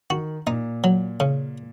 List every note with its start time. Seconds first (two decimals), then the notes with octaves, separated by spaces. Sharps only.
0.10 D#3 F#4
0.47 A#2 D#4
0.84 F#3
1.20 C#3